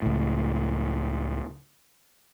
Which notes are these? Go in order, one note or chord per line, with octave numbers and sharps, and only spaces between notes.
C#2 A2